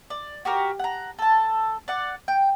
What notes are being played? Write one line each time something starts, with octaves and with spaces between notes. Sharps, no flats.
D5
F#4 G4 A#4
F#5 A#5
A4 A5
D5 F#5
G5